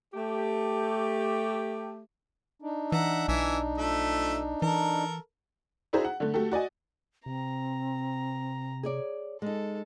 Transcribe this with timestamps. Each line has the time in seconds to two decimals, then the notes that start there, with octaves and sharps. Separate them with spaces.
0.14 A3 G4
2.62 D4 D#4
2.92 E3 E5 F#5 A#5
3.28 B1 E3 E5 G#5
3.78 F3 A3 E5
4.62 E3 A4 A#4
5.93 D4 E4 F#4 G#4 C5 A#5
6.05 F#5
6.20 D3 A3
6.34 A3 F#4 G4 A4
6.52 F#4 D5 D#5 G#5
7.26 C3 C4 A#5
8.83 G#4 C#5 D5
9.42 G#3 D#4 A4